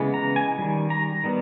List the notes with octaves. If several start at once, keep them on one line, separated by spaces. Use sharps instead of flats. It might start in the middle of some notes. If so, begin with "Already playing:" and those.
Already playing: C#3 E3 G#3 B3
A#5
G#5
D#3 G3
A#5
D#3 G3 B3